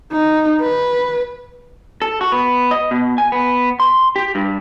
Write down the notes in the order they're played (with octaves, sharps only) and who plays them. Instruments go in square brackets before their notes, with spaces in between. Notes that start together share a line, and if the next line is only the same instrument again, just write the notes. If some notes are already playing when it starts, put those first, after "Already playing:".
[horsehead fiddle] D#4
B4
[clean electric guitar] A4
F#4
B3
D#5
B2
G#5
B3
C6
G4
G2